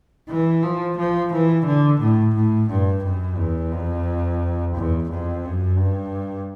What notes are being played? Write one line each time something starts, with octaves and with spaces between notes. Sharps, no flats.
E3
F3
F3
E3
D3
A2
A2
G2
F#2
E2
F2
E2
F2
F#2
G2